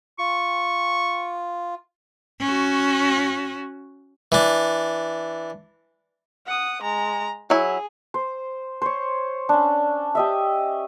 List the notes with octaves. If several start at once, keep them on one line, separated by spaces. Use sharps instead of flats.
F4 C#6
C#4 F#4
E3 D4
F#5 D#6
G#3 A#5
F#3 E4 G#4
C5
C5 C#5
C#4 D4
G4 D#5 E5